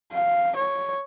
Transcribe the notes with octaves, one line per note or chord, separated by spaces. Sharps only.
F5
C#5